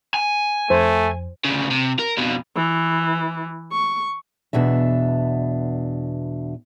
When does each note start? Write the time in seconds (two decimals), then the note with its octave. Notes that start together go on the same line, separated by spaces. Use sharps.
0.14 G#5
0.70 F2 A3 C5
1.44 D2 C#3
1.71 C3
1.99 A#4
2.17 F2 B2
2.56 E3
3.72 C#6
4.53 E2 B2 D4 E5